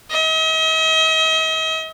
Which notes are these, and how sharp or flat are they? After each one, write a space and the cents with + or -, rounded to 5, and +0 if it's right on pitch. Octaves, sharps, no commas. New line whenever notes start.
D#5 +45